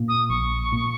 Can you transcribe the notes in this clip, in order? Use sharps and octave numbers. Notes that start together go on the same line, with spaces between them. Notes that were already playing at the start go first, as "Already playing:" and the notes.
Already playing: A#2 A#3
D#6
A#1 C#6
A#2 A#3